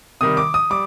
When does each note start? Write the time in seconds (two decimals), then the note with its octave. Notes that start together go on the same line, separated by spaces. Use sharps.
0.21 C3 D#3 G3 D#6
0.37 D6
0.54 D#6
0.70 G3 D6